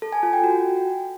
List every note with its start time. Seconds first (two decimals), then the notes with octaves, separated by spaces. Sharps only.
0.02 A4
0.12 G#5
0.23 F4
0.33 G5
0.43 F#4